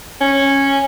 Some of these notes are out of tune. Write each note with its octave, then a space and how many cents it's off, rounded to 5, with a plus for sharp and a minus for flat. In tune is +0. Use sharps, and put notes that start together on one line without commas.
C#4 -10